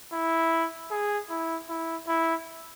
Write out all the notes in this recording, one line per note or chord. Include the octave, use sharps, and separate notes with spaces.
E4
G#4
E4
E4
E4